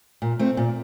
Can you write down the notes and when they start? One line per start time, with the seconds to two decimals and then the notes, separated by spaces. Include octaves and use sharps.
0.22 A#2
0.39 A3 C4
0.57 A#2